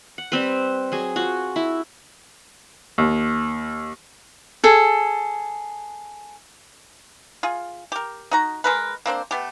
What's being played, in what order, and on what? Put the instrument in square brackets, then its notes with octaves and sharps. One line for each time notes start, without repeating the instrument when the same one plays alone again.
[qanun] F#5
G3 C4 B4
F#3 G#4
F4 F#4
E4
[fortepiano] D#2
[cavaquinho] G#4 A4
[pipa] F4 G#4
G4 A#4
D#4 F#4 A#5
G#3 A#4 B4
A#3 C4 D4 C5
A3 B3 G4